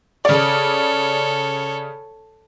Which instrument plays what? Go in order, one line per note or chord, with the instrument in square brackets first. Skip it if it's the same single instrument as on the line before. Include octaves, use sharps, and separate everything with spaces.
[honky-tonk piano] C#3 D5 [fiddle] A4 C#5